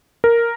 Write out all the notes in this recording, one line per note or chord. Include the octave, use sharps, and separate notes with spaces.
A#4